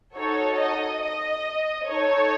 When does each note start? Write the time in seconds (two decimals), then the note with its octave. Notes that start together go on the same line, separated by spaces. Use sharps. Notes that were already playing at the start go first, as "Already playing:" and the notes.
0.16 D#4 F#4 A4 C#5
0.58 D#5
1.01 D#5
1.86 D#4 A4 C#5